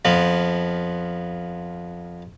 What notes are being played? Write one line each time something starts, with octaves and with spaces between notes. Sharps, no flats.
F2 F3 B3